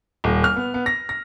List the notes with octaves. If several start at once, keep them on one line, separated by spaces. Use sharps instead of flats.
D#1
F6
B3
B3
A#6
A#6